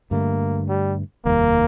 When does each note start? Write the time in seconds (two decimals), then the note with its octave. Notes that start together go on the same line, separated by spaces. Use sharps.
0.11 G2 D3 A3 A#3
0.68 G3
1.25 F1 D#2 D#3 G3 A#3